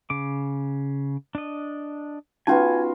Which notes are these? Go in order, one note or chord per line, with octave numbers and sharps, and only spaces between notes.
C#3 D6
D4 D#5
B3 C#4 D#4 F4 F#4 G#5 A5